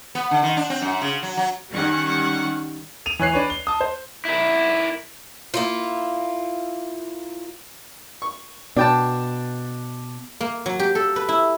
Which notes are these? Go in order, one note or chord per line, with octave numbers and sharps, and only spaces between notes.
B3
D3
D#3
D4
C4
F#2
C#3
F#3
F#3
D#3 G3 C#4 F#5 C#6
D#7 F7
E3 C#5 F#6 C7
D4 B4 C#5
G7
A5 D#6
C5
E4 A#4
A#3 E4 F4
C#6
B2 D4 G5 A5
A#3
F#3
G4
A4
B4
E4